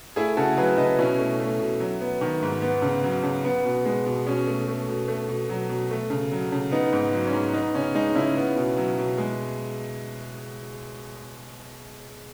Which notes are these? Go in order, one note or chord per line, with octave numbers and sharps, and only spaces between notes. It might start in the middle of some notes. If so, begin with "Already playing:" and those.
A3 E4 G#4
C#3 F#4 A4
F#3 G#4 B4
C#3 B4 D#5
B2 C#4 E4
A3
A3
B2
F#3
B3
D#3
G#2
B3
C#3
F#3
C#3
B3
B2
G#3
B2
B2 C#4
A3
A3
B2
A3
B2
F#3
B2
A3
C#3
F#3
C#3
B3 D#4
G#2
F#3
C#4
G#2
B3 D#4
C#3 C#4
G#3 D#4
C#3 C#4 E4
B3
B2
F#3
B2
G#3